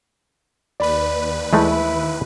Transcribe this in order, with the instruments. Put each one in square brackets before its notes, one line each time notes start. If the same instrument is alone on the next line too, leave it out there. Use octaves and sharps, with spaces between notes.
[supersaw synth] D#2 B4 [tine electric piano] D5 B5
[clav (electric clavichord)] E3 G#3 A3 [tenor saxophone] E4